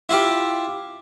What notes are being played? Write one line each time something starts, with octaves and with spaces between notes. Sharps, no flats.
E4 F4 G4